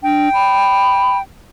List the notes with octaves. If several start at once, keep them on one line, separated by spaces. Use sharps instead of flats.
D4 G5
B5